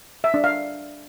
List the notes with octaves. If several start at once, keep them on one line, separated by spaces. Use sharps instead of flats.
E5
D4
F5